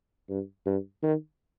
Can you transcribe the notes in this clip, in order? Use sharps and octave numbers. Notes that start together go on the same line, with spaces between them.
G2
G2
D#3